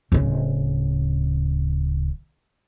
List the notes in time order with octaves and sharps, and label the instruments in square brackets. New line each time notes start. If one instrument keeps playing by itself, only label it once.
[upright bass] D1 C#3